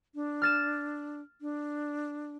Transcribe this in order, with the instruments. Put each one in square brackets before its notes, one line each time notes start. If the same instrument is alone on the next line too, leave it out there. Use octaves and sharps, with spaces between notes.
[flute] D4
[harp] F6 A6 E7
[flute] D4